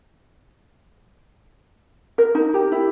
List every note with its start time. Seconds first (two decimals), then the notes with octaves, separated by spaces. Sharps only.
2.18 A#4
2.35 D#4
2.54 G4
2.72 E4